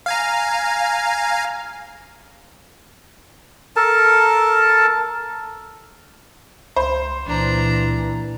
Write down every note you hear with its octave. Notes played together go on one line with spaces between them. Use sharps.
F5 G#5 A#5
A4 A#4 A5
C#2 C5
C#2 A#2 E3 D4 A#5